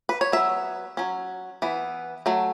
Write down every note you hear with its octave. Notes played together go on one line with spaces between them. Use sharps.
B4
C#5
F#3 B3 E5
F#3 C#4
E3 B3
F#3 A3